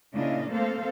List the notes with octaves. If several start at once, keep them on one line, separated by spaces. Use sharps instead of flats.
A#2 C#3 D4 E4 D#5 F5
A3 A#3 C4 A4 C5 F5